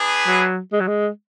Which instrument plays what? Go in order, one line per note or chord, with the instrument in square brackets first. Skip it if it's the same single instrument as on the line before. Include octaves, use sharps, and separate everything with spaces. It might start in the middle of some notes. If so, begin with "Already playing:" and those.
Already playing: [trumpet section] B3 D4 G#4 B4
[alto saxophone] F#3
G#3
F#3
G#3